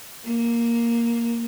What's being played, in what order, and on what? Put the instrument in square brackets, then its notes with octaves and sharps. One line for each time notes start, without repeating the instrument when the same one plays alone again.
[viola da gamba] A#3